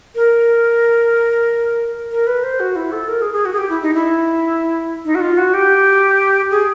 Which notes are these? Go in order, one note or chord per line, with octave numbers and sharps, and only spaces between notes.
A#4
A#4
B4
C5
F#4
E4
A4
A#4
G#4
G#4
F#4
G#4
G4
E4
D#4
E4
D#4
F#4
F4
F#4
G4
G#4